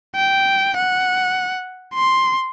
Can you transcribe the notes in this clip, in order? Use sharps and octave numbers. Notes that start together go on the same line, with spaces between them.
G5
F#5
C6